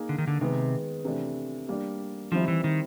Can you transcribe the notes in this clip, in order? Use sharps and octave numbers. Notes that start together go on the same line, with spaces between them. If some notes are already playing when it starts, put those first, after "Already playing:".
Already playing: A#3 D#4 G#4
D3
D#3
D3
C3 D#3 G#3 B3
C3 E3 A3 D4
G3 A#3 D4
D#3 F3 G3 C4 E4
E3
D#3